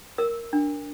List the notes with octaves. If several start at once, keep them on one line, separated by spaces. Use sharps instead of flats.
A#4 E6
D4